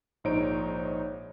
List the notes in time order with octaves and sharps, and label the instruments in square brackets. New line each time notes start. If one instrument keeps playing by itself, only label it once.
[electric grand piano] A#1 G#2 D#4 C5 C#5 D7